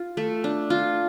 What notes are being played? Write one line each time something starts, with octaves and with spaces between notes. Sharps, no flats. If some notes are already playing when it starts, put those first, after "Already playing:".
Already playing: F4
A3
D4
F4